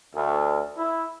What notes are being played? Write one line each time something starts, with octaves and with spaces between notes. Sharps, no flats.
D2
E4